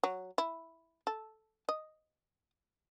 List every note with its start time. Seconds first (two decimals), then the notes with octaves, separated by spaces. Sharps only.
0.03 F#3
0.38 E4
1.07 A4
1.69 D#5